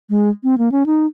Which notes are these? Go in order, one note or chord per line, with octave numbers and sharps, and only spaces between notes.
G#3
C4
A#3
C#4
D#4